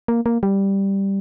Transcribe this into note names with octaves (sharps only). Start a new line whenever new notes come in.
A#3
A#3
G3